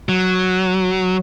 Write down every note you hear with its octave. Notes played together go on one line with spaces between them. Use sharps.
F#3